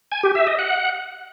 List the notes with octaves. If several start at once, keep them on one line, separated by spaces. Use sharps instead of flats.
G#5
G4
E5
D#5
F#5